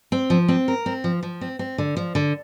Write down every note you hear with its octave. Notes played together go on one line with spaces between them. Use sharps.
C4
F3
C4
A#4
C4
F3
F3
C4
C4
D3
F3
D3